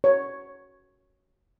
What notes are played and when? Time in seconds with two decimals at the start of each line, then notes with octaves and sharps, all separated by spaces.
0.04 C#5